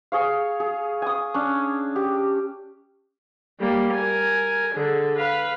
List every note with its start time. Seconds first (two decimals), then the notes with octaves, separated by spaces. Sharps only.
0.12 G#4 C#5 F5
0.60 G#4
1.02 G#5 D#6
1.34 C#4 D4
1.96 G4
3.60 G3 A#3
3.93 A#4 G#5
4.74 D3 G#4
5.16 B4 F5